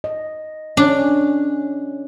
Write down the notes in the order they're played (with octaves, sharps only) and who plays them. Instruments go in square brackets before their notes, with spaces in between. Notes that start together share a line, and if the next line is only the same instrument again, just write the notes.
[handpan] D#5
[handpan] C#4 [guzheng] D4